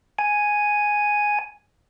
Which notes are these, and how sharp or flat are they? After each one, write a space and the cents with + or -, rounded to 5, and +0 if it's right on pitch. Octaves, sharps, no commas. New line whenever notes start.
G#5 +0